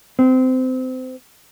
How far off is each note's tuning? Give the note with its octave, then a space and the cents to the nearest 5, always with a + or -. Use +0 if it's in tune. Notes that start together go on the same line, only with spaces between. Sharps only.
C4 -25